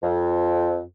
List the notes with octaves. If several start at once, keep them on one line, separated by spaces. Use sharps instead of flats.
F2